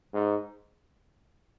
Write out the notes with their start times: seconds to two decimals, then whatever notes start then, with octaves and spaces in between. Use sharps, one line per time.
0.14 G#2